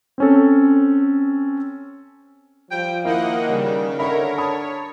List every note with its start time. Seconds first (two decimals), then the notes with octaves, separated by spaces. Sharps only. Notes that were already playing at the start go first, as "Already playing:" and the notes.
0.18 C4 C#4 A4
2.71 F3 G3 G5
3.05 D#3 A#3 E4 D#5 F#5
3.49 C#3 G3
3.99 D3 A#4 C#5 E5 B5
4.38 C#5 A5 B5 D#6